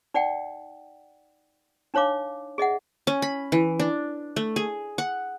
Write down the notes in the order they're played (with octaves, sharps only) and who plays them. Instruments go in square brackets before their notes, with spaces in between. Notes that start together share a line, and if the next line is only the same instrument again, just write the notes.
[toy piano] D#4 D5 F#5 G5
D4 D#4 C#5 F5 D6
G#4 D#5 E5 F#5
[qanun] C#4
B5
E3
D4
A3
G#4
F#5